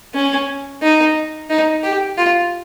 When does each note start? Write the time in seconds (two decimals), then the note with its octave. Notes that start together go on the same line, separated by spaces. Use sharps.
0.15 C#4
0.82 D#4
1.50 D#4
1.83 G4
2.18 F4